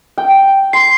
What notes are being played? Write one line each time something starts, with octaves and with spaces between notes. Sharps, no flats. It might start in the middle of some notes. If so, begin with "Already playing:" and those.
G5
C6 C7